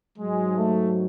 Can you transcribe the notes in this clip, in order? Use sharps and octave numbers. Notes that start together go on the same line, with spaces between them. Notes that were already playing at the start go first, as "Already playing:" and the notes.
G#2 F#3 G#3
A3